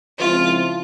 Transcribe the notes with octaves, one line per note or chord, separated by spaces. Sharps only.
C#3 F3 G#3 C4 E4 F4